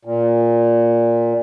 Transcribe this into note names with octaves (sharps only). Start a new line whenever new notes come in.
A#2